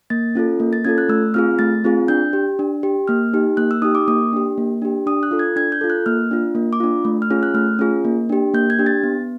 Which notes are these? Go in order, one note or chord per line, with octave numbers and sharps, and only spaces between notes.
A#3 A6
C#4 F4 A4
A#3
A6
C#4 F4 A4 G#6
F#6
A3 E6
C4 F4 G#4 F6
A3 A6
C4 F4 G#4
D4 G6
G4
D4
G4
A#3 F6
D#4 G4
A#3 F#6
E6
D#4 G4 D#6
D6
A#3 D#6
D4 G4
A#3
D4 G4
D4 D#6
F#6
F4 A4
G#6
D4 G#6
G6
F4 A4
F#6
A#3 F6
D4 F4
A#3
D6
D4 F4
A3
F6
C#4 F4 G#4
F#6
A3 F6
C#4 F4 G#4
A#3
D4 G4
A#3 G6
G#6
D4 G4
A6
B3